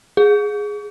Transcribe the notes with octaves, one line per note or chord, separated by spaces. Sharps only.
G#4